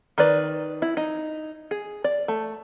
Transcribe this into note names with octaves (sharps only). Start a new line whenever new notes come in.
D#3 B4 D5
E4
D#4
G#4
D5
A3